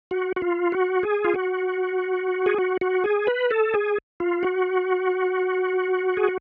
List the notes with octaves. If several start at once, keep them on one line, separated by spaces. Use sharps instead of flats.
F#4
F#4
F4
F#4
G#4
F4
F#4
G#4
F#4
F#4
G#4
B4
A4
G#4
F4
F#4
G#4